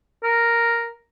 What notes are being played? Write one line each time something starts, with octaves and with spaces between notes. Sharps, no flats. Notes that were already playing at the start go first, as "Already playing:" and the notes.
A#4